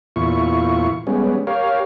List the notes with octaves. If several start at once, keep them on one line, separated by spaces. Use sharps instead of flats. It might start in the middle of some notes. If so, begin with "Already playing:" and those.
E2 A#2 E4 F4 C#6
G3 G#3 B3 C#4
G4 A#4 C#5 F5